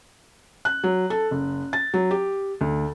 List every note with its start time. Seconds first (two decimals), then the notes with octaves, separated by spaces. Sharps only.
0.65 F#6
0.84 F#3
1.10 A4
1.31 F#1
1.73 A6
1.94 F#3
2.11 G4
2.61 D2